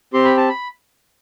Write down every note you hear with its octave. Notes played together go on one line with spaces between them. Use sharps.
C4 G4 C6
B5
A5
B5